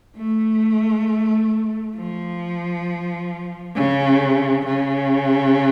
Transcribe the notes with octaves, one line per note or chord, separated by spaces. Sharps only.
A3
F3
C#3
C#3